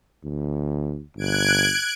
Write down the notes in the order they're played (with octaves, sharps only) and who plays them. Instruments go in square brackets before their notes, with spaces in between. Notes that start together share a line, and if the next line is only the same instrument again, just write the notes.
[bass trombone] D2
[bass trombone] G1 [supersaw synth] F#6 G#6 D7